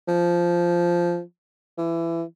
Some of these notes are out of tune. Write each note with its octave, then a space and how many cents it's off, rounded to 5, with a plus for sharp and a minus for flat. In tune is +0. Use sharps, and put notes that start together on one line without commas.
F3 -10
E3 +20